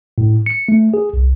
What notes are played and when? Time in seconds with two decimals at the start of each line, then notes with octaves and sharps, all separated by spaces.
0.18 A2
0.46 C#7
0.69 A3
0.94 G#4
1.13 C2